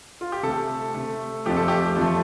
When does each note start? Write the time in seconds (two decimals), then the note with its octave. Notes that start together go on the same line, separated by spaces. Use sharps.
0.21 F4
0.32 G4
0.43 C3 A3 A4
0.94 C3 A3
1.46 F2 F3 A3 G4
1.56 A4
1.68 G4
1.96 F2 F3 A3